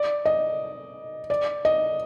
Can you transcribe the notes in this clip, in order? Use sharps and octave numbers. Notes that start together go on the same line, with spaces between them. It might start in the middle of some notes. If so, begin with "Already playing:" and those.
Already playing: D5
D#5
D5
D#5